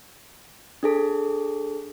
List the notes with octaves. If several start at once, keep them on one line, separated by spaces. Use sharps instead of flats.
D4 G#4 A4